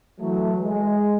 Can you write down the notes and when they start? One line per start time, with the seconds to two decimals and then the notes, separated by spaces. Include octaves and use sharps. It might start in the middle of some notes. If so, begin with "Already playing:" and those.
0.20 E3 F#3 A3
0.61 G#3